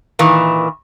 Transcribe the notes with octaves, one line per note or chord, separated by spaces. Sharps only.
A#2 D#3 E3